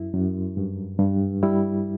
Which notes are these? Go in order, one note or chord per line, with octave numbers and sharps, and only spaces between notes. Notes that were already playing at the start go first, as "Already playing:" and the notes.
Already playing: F#2 E4
F#2
G2
G2
G3 E4